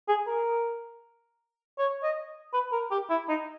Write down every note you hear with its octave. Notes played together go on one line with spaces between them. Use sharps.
G#4
A#4
C#5
D#5
B4
A#4
G4
E4
D#4